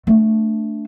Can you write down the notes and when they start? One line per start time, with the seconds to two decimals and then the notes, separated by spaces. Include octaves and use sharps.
0.07 A3 D4